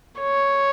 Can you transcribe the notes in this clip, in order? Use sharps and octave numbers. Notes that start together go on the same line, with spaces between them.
C#5